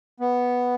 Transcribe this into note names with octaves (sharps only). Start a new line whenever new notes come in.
B3